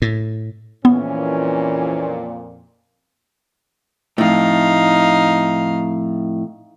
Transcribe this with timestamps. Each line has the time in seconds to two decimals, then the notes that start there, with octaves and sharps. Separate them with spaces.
0.02 A2
0.85 F2 A#2 E3 B3 C#4
4.18 F2 A2 D#4 F5